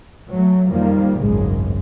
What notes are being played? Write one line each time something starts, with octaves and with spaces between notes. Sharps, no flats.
F#3 A3
F2 D#3 F3 G3 A#3
G#1 C#2 F#2 A2 C#3 G#3